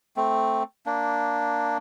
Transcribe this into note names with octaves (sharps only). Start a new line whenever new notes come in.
A3 C4
A#3 D4